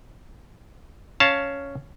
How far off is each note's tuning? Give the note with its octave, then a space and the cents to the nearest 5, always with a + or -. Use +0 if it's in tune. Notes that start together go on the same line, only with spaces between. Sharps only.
C#4 +5 F5 +0 A5 +5